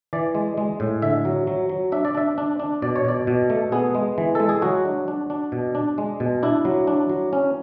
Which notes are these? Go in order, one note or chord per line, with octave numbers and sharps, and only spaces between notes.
E3 D5
G#3
G#3
A2
D3 E5
F#3
F#3
F#3
D4 E5
D5
D4 E5
D4
D4
B2 D5
C#5
B2 D5
B2
A3
B3 G#4
G#3
E3
G#3 A4
G#4
F#3 F#4
D4
D4
D4
B2
D4
G#3
B2
D4 E4
F#3
D4
F#3
C#4